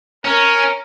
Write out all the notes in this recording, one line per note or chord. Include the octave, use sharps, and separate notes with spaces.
C#4 A#4